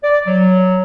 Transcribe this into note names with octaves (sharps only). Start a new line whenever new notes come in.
D5
F#3